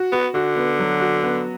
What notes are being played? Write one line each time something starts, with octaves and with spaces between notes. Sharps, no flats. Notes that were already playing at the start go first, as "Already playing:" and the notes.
Already playing: F#4
B3 F#4
D3 F#4
B3
F#3
F#4
B3